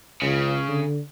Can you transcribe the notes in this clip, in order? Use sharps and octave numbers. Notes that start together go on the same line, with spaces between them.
C#2 C#3
D3